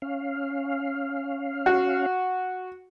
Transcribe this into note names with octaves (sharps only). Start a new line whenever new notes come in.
C#4 F5
F#4